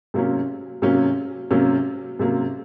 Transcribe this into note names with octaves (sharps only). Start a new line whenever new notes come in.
C3 F#3 A#3 C#4
C3 F#3 A#3 C#4
C3 F#3 A#3 C#4
C3 F#3 A#3 C#4